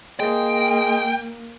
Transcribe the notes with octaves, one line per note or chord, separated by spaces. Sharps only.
G#3 A#3 G5